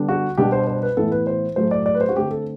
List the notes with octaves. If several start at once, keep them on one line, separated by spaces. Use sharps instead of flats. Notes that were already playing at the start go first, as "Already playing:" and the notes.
Already playing: D3 G3 B3 D4
F#4
B2 G3 B3 D4 G4
C5
C5
B4
A2 E3 B3 A4
B4
C5
A2 F#3 A3 C5
D5
D5
B4
C5
F#4
D3 A3 C4 G4
A4